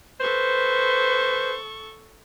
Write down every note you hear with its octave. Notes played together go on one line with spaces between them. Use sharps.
A4 B4 C5 C#6